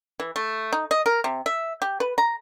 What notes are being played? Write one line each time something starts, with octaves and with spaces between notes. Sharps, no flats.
E3
A3
D#4
D#5
A#4
C3
E5
G4
B4
A#5